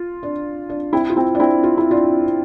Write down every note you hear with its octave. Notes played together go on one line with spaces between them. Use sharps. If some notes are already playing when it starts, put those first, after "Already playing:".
Already playing: F4
D4
D4
C4 E4
F4
C4 E4
D4
C4 E4
F4
E4
D4 F4